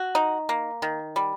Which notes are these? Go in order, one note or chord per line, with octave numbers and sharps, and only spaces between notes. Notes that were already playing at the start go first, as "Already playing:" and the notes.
Already playing: F#4
D#4
A#3
D#3
G3